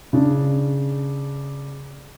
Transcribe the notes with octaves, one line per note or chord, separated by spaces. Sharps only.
C#3 D4